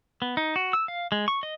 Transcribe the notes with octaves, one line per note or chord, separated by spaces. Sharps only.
B3
D#4
F#4
E6
F5
G#3
C#6
D#5